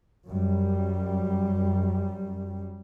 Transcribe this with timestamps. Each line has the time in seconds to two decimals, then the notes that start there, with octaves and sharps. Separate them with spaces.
0.27 F#2 G3